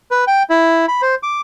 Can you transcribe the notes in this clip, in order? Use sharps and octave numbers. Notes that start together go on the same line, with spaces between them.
B4
G5
E4
B5
C5
D6